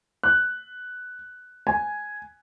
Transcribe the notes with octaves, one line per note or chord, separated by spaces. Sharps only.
F#6
G#5